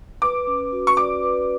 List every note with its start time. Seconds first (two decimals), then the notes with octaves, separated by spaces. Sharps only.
0.22 B4 D6
0.47 C#4
0.72 F#4
0.87 C#6
0.97 D5 D6
1.23 B4